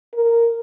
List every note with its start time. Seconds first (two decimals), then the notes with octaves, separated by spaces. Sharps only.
0.13 A#4